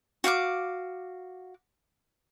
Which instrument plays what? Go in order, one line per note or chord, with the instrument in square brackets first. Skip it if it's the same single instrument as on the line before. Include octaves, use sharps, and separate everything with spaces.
[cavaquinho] F#4 F5 G5 D6